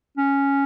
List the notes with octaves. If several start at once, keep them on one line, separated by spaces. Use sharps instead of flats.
C#4